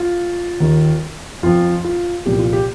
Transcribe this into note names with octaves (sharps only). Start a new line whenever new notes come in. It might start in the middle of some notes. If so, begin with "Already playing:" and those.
Already playing: F4
D#2 D#3
F2 F3 F4
F4
C2 A#2 F3 G4
F4
G4